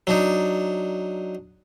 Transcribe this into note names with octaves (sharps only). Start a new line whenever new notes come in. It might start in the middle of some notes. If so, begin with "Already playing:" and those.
F#3 D4 D#4